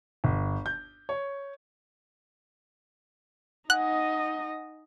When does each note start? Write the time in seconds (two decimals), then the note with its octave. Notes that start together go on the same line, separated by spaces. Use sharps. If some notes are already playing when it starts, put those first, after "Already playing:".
0.24 G1
0.66 G6
1.09 C#5
3.70 D#4 D#5 F#5 G#5 F#6